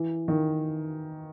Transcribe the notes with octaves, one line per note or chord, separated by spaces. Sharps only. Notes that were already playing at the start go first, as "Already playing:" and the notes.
Already playing: E3
D#3